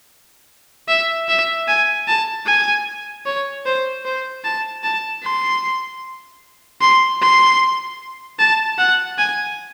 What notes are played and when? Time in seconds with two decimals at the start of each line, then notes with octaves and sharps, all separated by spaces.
0.88 E5
1.29 E5
1.68 G#5
2.08 A5
2.47 G#5
3.26 C#5
3.66 C5
4.05 C5
4.44 A5
4.84 A5
5.23 C6
6.81 C6
7.22 C6
8.39 A5
8.79 F#5
9.18 G#5